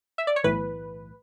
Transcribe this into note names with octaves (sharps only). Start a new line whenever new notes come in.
E5
D5
C#5
B1 A2 E3 B4